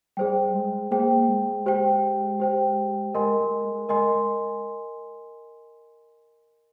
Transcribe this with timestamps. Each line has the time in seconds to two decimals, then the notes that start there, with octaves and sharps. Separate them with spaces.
0.17 G3 G#4 C5 G5
0.54 G#3
0.91 A#3 G#4 C5 G5
1.28 G#3
1.66 G4 C5 G5
2.40 G4 C5 G5
3.15 G#3 A#4 D#5 G#5 C6
3.40 G#3
3.65 G#3
3.89 G#3 A#4 D#5 G#5 C6